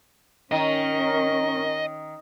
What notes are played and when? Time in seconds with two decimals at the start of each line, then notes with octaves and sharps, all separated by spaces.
0.52 D#3 C#4 A#4 D#5